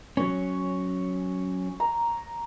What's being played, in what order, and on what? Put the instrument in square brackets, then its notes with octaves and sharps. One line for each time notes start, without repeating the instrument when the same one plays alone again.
[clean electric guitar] F#3 C#4 [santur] C#5
[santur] A#5